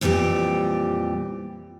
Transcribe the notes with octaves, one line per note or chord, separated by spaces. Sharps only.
F2 A#2 E3 G3 G4